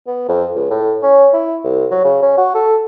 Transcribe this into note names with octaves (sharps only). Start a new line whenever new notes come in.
B3
F2
C#2
A2
C#4
E4
C2
F#3
C#3
C#4
F#4
A4